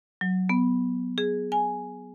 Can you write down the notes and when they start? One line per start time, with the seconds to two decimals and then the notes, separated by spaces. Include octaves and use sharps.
0.21 F#3
0.49 B3
1.18 G#4
1.52 G#5